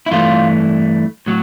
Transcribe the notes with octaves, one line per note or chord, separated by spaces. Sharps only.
E4
G2 E3 A3 F4
A2 F#3